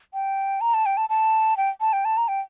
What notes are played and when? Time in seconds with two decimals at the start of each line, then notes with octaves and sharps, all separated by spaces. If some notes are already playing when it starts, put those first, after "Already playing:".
0.14 G5
0.61 A#5
0.74 A5
0.86 G5
0.97 A5
1.09 A5
1.57 G5
1.81 A5
1.93 G5
2.05 A5
2.17 A#5
2.28 G5